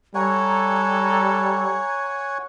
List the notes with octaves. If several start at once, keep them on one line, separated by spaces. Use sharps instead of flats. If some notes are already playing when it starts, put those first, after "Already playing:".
G3 A4 C#5 F#5 G#5 A#5